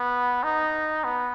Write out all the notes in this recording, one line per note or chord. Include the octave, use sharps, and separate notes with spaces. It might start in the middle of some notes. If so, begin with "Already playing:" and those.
Already playing: B3
D#4
B3